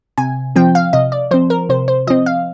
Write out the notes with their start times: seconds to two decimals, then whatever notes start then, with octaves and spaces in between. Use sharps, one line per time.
0.18 C3 G#5
0.56 F3 C4 G5
0.75 F5
0.93 C3 D#5
1.12 D5
1.31 F3 C4 C5
1.50 A#4
1.69 C3 C5
1.88 C5
2.07 F3 C4 D#5
2.26 F5